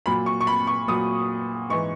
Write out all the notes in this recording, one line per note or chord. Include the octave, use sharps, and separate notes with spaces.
A#2 F#3 B5
C#6
C#6
B5
C#6
A#2 F#3 D#6
G#2 E3 C#6